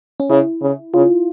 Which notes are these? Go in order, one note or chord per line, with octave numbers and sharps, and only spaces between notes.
C#4
C#3 E4
C#3
C#3 F4